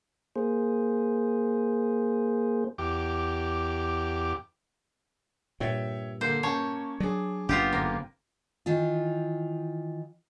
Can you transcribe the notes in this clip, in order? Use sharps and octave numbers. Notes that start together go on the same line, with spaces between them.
A#3 G#4 C5
E2 G4 D6
G2 A#2 C#5 E5 G5
D3 A#3 C5
A#3 C#4 C#5 A5
F#3 D4 G#4
F#1 B3 D4 F4 G4
G1 A#3 C4 A#6
D#3 E3 F4